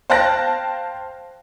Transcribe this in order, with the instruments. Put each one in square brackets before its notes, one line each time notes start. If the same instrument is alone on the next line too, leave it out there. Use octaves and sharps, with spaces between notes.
[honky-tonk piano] C5 F5 G5 A5 F#6 A#6